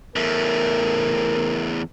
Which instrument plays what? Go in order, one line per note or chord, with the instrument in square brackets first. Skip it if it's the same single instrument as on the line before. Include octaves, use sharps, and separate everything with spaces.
[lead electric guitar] E2 A3 [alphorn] A#4